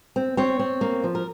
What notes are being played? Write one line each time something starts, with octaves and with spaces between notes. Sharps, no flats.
C4
C4 C#5
C4
A#3
F3
A#4